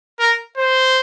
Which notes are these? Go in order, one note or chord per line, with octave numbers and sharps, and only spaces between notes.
A#4
C5